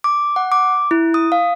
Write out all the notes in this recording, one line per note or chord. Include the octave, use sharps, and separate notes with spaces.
D6
F#5
D6
E4
D#6
F5